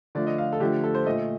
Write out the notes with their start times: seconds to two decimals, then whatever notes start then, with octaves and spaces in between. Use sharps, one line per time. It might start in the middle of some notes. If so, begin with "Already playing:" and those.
0.15 D3 F3 A3 D5
0.27 D#5
0.38 F5
0.53 A4
0.60 D3 F3 A3 G4
0.84 A4
0.95 C5
1.06 A#2 A3 D#5